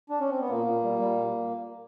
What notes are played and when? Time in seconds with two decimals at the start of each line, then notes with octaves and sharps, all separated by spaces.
0.10 D4
0.20 C#4
0.30 C4
0.40 B3
0.50 A#2 A#3
0.66 A#2
0.83 G3
0.99 G3
1.16 A#2